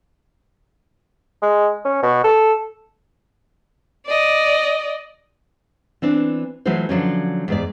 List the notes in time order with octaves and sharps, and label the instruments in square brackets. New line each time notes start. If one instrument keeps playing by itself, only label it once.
[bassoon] G#3
C#4
B2
A4
[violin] D5 D#5
[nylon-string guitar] E3 C4 D4
E3 F#3 A3 F4 F#4 C5
D3 F3 F#3 C#4
E2 G#2 D5